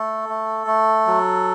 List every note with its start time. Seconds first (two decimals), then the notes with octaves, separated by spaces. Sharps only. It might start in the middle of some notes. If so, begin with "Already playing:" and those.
Already playing: A3 A4
0.29 A3
0.67 A3
1.07 F#3